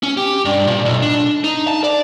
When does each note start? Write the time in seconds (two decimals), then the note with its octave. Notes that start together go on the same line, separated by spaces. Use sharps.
0.03 C#4
0.17 G4
0.45 G2
0.67 A#2
0.85 B1
1.02 D4
1.44 D#4
1.68 A5
1.84 D5